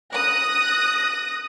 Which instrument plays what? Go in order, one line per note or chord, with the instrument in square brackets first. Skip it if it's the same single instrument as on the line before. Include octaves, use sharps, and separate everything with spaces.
[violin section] D#6 F#6 A#6